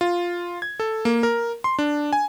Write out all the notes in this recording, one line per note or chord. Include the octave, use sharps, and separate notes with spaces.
F4
G#6
A4
A#3
A#4
C6
D4
G#5